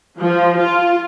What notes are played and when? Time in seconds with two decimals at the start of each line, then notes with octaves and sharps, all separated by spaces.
0.19 F3
0.59 F4